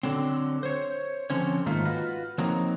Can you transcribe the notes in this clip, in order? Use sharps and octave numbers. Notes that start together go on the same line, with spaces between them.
D3 F#3 C4
C5 C#5
D3 F3 C4 C#4 C#5
G#2 D#3 A3 A#3 F4
F4 F#4 B4
F3 F#3 A#3 C4 D#4